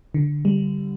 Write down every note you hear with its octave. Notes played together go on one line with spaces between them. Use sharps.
D3
G3